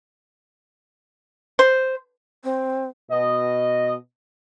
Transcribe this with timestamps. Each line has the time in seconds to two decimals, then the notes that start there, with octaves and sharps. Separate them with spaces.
1.59 C5
2.44 C4
3.10 B2 D#5